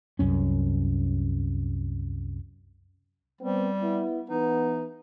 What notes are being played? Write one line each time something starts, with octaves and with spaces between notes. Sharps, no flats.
C2 F#2 C#4
G3 B3 C4
B3 E4
E3 B3 D#4